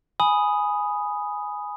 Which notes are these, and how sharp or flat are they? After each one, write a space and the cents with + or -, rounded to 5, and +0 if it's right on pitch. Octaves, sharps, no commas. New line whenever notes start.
G#5 +0 B5 +0 D#6 +0